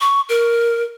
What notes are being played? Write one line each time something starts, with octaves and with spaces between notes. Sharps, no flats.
C#6
A#4